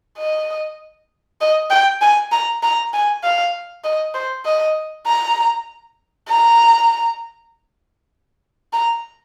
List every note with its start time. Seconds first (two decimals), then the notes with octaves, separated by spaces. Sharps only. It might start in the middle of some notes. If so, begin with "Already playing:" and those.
0.18 D#5
1.41 D#5
1.71 G5
2.01 G#5
2.32 A#5
2.63 A#5
2.93 G#5
3.23 F5
3.84 D#5
4.14 C5
4.45 D#5
5.07 A#5
6.29 A#5
8.73 A#5